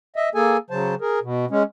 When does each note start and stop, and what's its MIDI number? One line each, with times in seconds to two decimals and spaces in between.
0.16 0.29 75
0.16 0.29 76
0.35 0.57 58
0.35 0.57 68
0.35 0.57 69
0.35 0.57 80
0.70 0.95 49
0.70 0.95 54
0.70 0.95 72
0.70 0.95 81
1.01 1.19 68
1.01 1.19 70
1.23 1.46 47
1.51 1.63 56
1.51 1.63 61